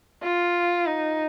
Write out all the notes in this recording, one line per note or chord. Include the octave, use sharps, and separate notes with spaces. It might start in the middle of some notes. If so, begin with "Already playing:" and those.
F4
D#4